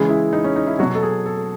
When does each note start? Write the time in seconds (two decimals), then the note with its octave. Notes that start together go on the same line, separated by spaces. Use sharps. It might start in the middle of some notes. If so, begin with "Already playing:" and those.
Already playing: C#3 E3 G#3
0.09 E4
0.33 D#4
0.44 C#4
0.56 D#4
0.67 E4
0.79 F#3 F#4
0.83 B2
0.95 A4
1.03 G#4
1.26 A4